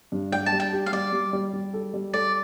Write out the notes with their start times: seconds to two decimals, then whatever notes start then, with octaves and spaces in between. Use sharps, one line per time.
0.12 G2
0.32 D4 G5
0.46 A5
0.52 G3
0.60 G5
0.73 G4
0.86 F5
0.92 G3 D5
1.13 G3
1.33 G3
1.53 G3
1.74 A4
1.94 G3
2.14 A4 D5